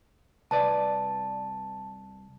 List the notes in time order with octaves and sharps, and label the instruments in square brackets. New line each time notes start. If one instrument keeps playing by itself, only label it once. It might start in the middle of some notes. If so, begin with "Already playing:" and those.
[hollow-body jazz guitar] C2 B4 D5 [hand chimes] A5